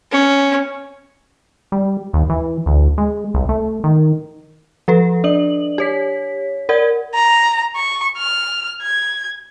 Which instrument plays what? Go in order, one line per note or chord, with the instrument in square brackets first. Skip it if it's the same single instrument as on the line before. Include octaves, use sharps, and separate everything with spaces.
[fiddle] C#4
[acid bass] G3
D#2
E3
D2
G#3
C2
A3
D#3
[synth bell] F3 A4 B4
D4 D5 F#7
G4 C#5 B6
A#4 D5 F#5 G#6
[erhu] A#5
C#6
F6
G#6